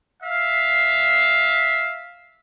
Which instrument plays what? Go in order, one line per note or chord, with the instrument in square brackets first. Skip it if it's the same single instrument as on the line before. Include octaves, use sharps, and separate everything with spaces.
[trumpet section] E5 F5